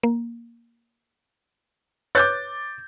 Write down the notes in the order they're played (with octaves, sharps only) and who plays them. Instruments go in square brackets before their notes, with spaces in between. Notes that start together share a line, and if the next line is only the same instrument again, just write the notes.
[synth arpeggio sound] A#3
[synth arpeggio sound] B4 C#5 F#6 [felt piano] D6 G6 A6